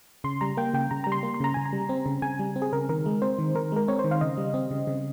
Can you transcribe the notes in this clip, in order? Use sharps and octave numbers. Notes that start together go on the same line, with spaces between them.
C#3 C6
G3 A#5
A#3 G5
C#3 G5
C#3 A#5
G3 A#5
C6
A#3
C6
C#3 A#5
C#3 G#5
A#5
G3
C4
C#3
C#3 G#5
G3
C4
G#4
C#3 A#4
D#3 A#4
G#3
C4 C5
D#3
D#3 A#4
G#3 A#4
C4 C#5
C5
D#3
F5
C#3 D#5
G3
C4
C#3
C#3